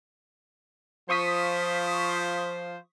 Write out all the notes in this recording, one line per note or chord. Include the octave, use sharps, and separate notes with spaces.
F3 F4 C5 C#6 D#6 B6